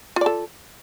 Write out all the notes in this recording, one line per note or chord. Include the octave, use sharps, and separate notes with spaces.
F4 A4 D5